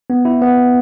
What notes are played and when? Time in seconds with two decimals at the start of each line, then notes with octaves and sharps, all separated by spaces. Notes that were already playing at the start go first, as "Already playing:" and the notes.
0.10 B3
0.25 E4
0.41 B3